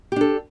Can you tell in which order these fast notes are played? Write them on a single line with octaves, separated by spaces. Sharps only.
G4 D4 A4